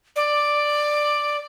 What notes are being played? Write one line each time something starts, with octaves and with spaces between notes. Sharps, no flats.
D5